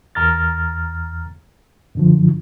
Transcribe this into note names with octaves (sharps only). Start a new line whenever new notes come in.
E2 A#5 F6 A6
F#2 D3 F3